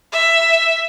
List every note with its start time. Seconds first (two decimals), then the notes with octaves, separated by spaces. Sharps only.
0.12 E5